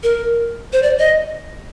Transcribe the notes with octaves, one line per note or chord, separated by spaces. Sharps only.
A#4
C5
D5
D#5